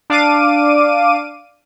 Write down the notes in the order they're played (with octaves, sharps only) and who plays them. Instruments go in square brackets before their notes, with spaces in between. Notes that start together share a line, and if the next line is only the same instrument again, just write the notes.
[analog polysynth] D4 F5 D6 D#7